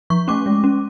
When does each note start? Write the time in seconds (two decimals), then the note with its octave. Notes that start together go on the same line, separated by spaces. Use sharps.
0.10 F3 C#6
0.28 A3 C#4 D6
0.46 G#3
0.64 C#4